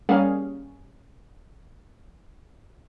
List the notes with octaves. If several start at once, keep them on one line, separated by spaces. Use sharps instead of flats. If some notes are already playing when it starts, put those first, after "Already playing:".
G3 A#3 C#4 G#4 F5